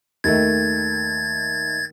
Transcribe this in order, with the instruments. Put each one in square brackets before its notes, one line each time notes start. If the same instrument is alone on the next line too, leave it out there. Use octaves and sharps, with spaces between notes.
[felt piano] D#2 D#3 A3 [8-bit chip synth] G#6 A6